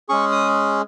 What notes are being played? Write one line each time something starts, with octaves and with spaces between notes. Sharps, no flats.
G#3 C#4 G#4 C#6
D#6